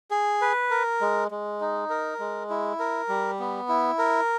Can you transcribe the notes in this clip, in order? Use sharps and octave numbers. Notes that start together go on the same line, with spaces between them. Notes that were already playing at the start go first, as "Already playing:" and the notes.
G#4
B4
A#4
G#3
G#3
D#4
A#4
G#3
E4
A#4
G3
B3
E4
A#4